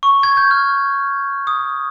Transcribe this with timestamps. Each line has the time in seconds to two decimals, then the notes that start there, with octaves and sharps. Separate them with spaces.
0.03 C#6
0.23 G#6
0.37 G6
0.51 F6
1.47 D#6